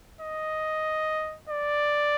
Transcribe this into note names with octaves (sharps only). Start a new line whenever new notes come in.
D#5
D5